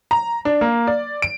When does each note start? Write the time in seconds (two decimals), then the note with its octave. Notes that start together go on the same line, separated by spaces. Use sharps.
0.11 A#5
0.45 D4
0.61 A#3
0.87 D5
1.22 D7